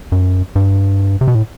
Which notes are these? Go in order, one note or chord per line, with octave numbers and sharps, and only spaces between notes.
F#2
G2
C3
B2
A2